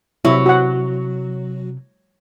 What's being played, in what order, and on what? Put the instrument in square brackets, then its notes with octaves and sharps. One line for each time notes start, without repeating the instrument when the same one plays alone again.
[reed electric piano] C3 [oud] F#3 [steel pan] E4
[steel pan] F#4 F#5